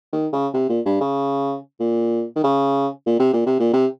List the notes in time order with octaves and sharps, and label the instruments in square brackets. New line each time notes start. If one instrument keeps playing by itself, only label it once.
[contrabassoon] D#3
C#3
C3
A#2
G2
C#3
A#2
D#3
C#3
A#2
C3
A#2
C3
A#2
C3